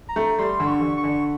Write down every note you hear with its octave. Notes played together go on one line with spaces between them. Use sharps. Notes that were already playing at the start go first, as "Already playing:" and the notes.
A#5
A3
G3 C6
D3
C#6
D3
C#6
D3